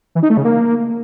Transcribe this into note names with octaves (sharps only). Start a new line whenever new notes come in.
E3
D#4
A3
C#3
A#3